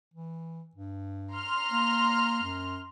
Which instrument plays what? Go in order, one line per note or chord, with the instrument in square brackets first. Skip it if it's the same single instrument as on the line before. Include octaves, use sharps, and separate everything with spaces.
[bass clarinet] E3
G2
[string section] A#5 C6 F6
[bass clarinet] A#3
F#2